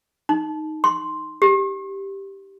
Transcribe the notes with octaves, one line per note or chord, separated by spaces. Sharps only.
D#4
C6
G4